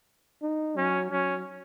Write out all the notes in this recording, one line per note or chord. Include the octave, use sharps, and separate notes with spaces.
D#4
F#3 C#4
F#3 C#4